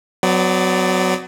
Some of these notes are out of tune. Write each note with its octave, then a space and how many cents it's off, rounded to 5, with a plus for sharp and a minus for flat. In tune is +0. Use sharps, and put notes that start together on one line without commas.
F#3 +0 B3 +40 D5 +0